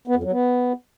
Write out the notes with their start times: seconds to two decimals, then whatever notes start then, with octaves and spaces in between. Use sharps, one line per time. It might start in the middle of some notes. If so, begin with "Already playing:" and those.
0.08 B3
0.16 F2
0.24 F#3
0.32 B3